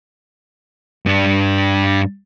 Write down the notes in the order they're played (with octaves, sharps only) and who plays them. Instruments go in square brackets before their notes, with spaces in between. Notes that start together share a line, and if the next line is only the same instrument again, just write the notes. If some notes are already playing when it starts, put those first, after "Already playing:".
[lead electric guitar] G2 D4